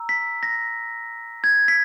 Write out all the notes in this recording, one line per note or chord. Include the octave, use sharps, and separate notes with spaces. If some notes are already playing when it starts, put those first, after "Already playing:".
Already playing: A#5 E6
B6
A#6
G#6
B6